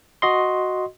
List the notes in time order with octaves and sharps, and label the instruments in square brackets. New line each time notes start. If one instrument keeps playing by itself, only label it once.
[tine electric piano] F#4 D#5 C6